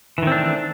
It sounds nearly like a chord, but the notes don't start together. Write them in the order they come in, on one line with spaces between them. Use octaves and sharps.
E3 D#3 C4 D4 A3